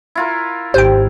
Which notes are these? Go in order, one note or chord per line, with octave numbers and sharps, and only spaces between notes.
E4 F4 A#4
G#1 G4 C5 G5